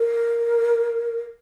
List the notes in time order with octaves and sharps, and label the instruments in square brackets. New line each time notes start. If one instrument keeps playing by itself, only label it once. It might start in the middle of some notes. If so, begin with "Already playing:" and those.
Already playing: [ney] A#4